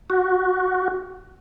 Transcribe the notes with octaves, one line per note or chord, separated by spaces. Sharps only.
F#4